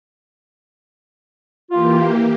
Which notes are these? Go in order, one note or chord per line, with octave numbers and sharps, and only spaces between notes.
E3 A#3 F4 G4